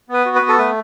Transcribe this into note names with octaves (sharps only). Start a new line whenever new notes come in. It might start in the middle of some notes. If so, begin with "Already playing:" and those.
B3 B4
F#4
B4
B3
A4
A3 B4